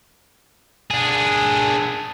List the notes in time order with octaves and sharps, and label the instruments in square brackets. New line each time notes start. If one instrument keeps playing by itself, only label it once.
[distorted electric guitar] D4 G#4